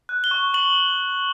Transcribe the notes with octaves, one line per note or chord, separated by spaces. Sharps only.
F#6
G7
C#6
C#6 F#7